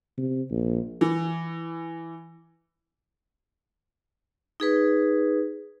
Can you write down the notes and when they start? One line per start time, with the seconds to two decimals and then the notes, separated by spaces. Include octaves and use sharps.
0.18 C3
0.51 A#1
1.01 E3
4.60 D#4 G#4 B4